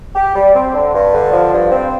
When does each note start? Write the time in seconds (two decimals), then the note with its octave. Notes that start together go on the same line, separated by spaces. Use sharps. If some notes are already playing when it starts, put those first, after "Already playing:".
0.16 G4
0.35 G3
0.55 C4
0.74 D3
0.94 G2
1.13 D3
1.32 F3
1.52 G2
1.71 C4